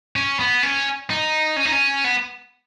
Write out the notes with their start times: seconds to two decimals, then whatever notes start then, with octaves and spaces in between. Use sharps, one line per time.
0.16 C#4
0.39 B3
0.63 C#4
1.10 D#4
1.56 C#4
1.65 D#4
1.72 C#4
2.04 B3